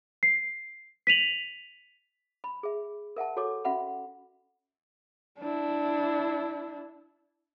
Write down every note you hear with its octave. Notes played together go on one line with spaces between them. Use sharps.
C7
B6 D#7 F7 F#7
B5
G#4 E5
A#4 E5 F#5 A5
F#4 A4 C#5 D6
C#4 F#4 E5 F#5 B5
D4 E4